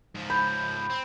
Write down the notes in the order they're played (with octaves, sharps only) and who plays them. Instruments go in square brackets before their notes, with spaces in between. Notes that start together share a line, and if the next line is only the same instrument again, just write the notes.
[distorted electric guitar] G#2 F3
[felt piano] B5 [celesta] G6
[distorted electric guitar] C4